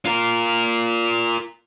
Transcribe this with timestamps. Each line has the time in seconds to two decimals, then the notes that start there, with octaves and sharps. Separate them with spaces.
0.06 F4 A#4